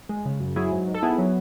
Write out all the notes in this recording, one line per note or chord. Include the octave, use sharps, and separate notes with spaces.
G#3
C#3
F#2
F#3 E4 G#4
G#2
G#2
A4
B3 E4 G#4
F#3